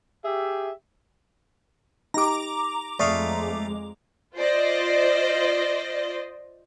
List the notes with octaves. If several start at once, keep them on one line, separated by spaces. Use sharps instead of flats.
G4 G#4 E5
D#4 G4 A#5 D6
F2 G#3 A3 D5 F5 C#6 D#6
F4 C5 D5 D#5